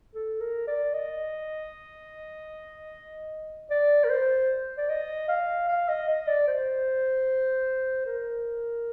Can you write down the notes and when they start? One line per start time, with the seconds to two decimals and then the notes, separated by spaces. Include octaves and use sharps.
0.15 A4
0.41 A#4
0.67 D5
0.94 D#5
3.70 D5
4.04 A#4
4.10 C5
4.78 D5
4.89 D#5
5.28 F5
5.68 F5
5.89 D#5
6.08 D#5
6.27 D5
6.48 C5
8.06 A#4